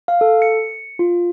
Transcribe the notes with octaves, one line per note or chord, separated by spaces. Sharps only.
F5
A4
C#7
F4